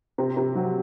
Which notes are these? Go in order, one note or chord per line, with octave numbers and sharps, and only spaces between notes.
C3
C3
F#3